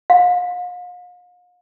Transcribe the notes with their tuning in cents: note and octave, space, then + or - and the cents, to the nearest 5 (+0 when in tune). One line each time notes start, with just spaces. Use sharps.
F5 +40